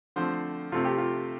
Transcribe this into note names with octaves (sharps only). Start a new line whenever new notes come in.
D3 F3 A3 C4 C5
C3 A3 C4 F4
G4
F4